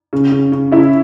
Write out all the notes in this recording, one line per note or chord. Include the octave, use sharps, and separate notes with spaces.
C#3
C#3
C#3
C#3 E4